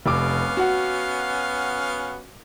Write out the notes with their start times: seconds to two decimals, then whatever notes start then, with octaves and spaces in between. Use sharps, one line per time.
0.06 F1 B3 C#4 F5 D6
0.57 F#4 F#5